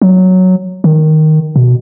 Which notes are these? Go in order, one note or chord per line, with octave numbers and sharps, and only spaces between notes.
F#3
D#3
B2